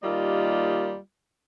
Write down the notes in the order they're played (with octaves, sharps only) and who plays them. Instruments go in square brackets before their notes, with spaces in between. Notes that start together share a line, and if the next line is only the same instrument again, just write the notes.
[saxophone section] D#2 G3 A#3 F4 D#5